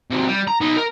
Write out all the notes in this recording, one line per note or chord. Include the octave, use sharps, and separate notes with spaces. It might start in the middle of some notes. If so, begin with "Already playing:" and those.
C3 F#3
G3
A#5
B3 D#4
A#4